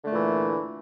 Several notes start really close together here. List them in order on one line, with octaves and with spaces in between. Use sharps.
D3 A3 A#2 E3